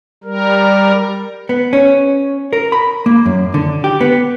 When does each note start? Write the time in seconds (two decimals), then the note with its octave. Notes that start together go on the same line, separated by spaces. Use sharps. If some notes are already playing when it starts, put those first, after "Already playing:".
0.24 G3 A#4
1.49 B3
1.73 C#4
2.53 A#4
2.72 B5
3.06 A#3
3.26 F#2
3.54 D3
3.84 G4
4.01 B3